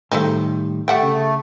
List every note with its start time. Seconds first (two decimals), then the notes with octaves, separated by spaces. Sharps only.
0.12 A2 D#3 G3 A3 C4 D#4
0.88 G3 A3 F#5 G5
1.03 C#3